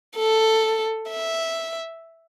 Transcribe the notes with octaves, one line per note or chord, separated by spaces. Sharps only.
A4
E5